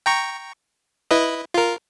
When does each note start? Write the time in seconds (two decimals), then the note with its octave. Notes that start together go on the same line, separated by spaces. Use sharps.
0.06 G5 A#5 C#6
1.11 E4 B4 D#5
1.54 F4 A#4